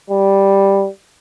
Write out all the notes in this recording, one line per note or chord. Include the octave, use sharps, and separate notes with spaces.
G3